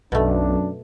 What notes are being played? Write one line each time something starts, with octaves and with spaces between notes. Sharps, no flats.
B1 F#2 B2 A3 D4